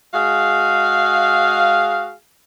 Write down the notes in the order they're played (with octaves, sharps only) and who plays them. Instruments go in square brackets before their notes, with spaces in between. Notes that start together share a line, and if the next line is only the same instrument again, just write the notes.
[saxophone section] G#3 F#4 G#4 F5